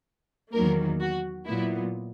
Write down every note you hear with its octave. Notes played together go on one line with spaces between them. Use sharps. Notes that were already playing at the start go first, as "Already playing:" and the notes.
E2 D#3 F#3 A#3 A#4
F#4
A#2 F#3 B3 E4